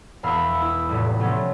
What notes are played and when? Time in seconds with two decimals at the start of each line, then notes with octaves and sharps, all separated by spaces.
0.23 E1 E2 F5 B5 E6 F6
0.62 E4
0.89 F1 A2 G3
1.20 C3 F#3 A3 B3 C#4